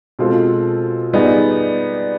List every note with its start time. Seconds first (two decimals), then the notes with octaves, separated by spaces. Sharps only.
0.19 B2 G#3 C4 F4 A4
1.13 G3 B3 D#4 G#4